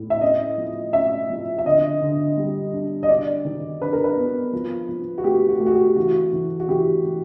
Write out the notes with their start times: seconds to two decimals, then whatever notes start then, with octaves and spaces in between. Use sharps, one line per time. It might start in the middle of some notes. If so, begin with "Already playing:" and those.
Already playing: A2
0.10 E5
0.21 C#4 D#5
0.58 F3
0.93 C#4 E5
1.30 F3
1.58 E5
1.66 D3 D#5
2.01 D3
2.37 G3
2.73 D4
3.03 D#5
3.09 D4 D5
3.45 D#3
3.82 D4 B4
3.93 A#4
4.04 B4
4.17 B3
4.53 F3
4.89 F3
5.18 F#4
5.24 A3 G4
5.48 F#4
5.60 A3
5.66 F#4
5.72 G4
5.96 E3 F#4
6.33 E3
6.60 F#4
6.69 E3 G4
7.05 E3